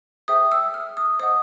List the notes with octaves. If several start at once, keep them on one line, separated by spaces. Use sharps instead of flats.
G#4 C5 E5 G5 D#6
E6
F6
D#6
C5 D#5 F#5 D#6